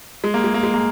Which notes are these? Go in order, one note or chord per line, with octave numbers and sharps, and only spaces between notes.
G#3
A#3
G#3
A#3
G#3
A#3